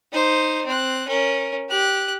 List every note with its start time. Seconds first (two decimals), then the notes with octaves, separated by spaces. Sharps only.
0.12 D#4 C5
0.65 C4 F#6
1.07 C#4 A#4
1.70 G4 F#6